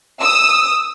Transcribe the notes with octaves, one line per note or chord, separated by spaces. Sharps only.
D#6 E6